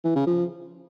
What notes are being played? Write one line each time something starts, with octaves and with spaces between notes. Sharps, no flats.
E3
C#3
F3